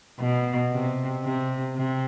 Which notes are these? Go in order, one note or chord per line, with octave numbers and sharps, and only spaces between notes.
B2
C3
C3
C3